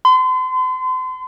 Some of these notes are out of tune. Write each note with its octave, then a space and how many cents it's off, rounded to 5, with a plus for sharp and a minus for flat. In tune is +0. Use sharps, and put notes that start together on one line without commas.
C6 -40